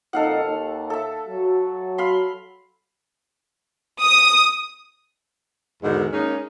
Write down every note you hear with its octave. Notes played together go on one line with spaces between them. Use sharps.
F2 A#2 D#4 A4 F5 F#5
D#2 D#3
A4 E5
F#3 F#4
F5 B5 C6
D#6
E2 G#2 D3 D#3 F#4
G#3 A#3 C#4 D#4